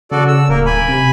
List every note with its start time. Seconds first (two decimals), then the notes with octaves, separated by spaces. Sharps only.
0.12 C#3 F#4 A4 D5
0.28 E6
0.49 D1 A#3 A#4
0.66 G#5 B5
0.89 C3